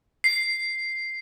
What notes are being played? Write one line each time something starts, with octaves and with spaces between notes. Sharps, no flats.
C7